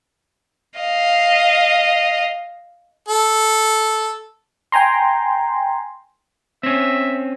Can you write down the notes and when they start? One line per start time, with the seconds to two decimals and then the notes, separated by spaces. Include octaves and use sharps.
0.79 D#5 F5
3.08 A4
4.72 G5 G#5 A#5 C6
6.63 C4 C#4 E5